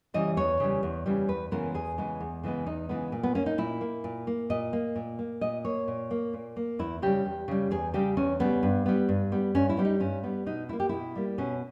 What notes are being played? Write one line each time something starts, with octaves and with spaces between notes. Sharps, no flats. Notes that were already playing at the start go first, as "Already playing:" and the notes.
C#3 E3 G3 D#5
E2 C#5
C#3 E3 G3
E2
C#3 E3 G3
E2 B4
C#3 E3 G#3 B3 A#4
E2 G#4
C#3 E3 G#3 B3
E2
C#3 E3 G#3 B3
E2 D#4
C#3 E3 G#3 B3
A#2
B3
A#3 C#4
D#4
A#2 E4
A#3
A#2
A#3
A#2 D#5
A#3
A#2
A#3
A#2 D#5
A#3 C#5
A#2
A#3
A#2
A#3
E2 E4
C#3 G3 G4
E2
C#3 G3
E2 G#4
C#3 G3 G4
E2 C#4
C#3 G3 B3
G2
G3 B3
G2
G3 B3
G2 C#4
E4
G3 B3
D#4
G2 C#4
G3 B3
B2 D#4
G3 A#3 E4
G4
B2 E4
G3 A#3
B2 C#4